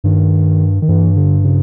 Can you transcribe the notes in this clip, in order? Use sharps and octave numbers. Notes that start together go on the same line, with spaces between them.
G2 D#3
D#3
G2 E3
D3
C#3